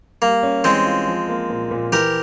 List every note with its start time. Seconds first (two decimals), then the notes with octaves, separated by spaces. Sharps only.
0.22 G3 A#3
0.43 C#4
0.64 E3 G#3 C4
0.86 F4
1.07 F3
1.29 A#3
1.50 A#2
1.71 A#2
1.92 E3 G4 A#4